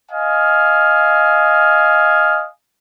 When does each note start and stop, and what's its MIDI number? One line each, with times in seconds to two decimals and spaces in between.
0.11 2.46 75
0.11 2.46 77
0.11 2.46 80